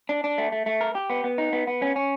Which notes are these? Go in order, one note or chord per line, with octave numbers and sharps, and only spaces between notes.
D4
D4
A3
A3
A3
A#4
G4
B3
B3
D#4
B3
B3
C#4
C#4